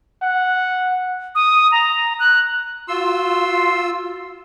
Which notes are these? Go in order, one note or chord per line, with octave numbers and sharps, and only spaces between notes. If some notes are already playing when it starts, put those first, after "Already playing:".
F#5
D#6
A#5
F#6
F4 F#4 C6 E6